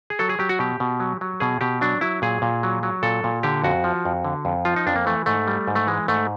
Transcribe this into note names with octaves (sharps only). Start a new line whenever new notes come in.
G#4
F#3 A4
G#4
F#3 G4
F#4
B2 G4
B2
F#3
F#3
B2 G#4
B2 G4
F#3 D4
F#3 E4
A#2 G#4
A#2
F#3
F#3
A#2 A4
A#2
D3 G4
F2 F#4
F3
F2
D3
F2
F3 F4
D#4
F2 D4
A#3
E3 A3
G#2 A3
G3
G#2
A3
E3 G#3
G#2 A3